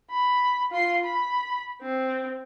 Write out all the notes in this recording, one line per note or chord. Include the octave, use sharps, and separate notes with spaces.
B5
F4 C6
B5
C4